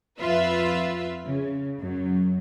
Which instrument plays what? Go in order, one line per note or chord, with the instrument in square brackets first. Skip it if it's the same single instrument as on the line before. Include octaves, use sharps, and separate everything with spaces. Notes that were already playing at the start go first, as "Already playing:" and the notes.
[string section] F2 F4 B4 E5
C#3
F#2 F#3